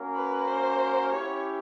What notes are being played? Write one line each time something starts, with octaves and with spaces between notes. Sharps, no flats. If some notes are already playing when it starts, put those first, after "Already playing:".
Already playing: A#3 C#4 F#4 A#4
B4
C5
C#4 E4 G4 C#5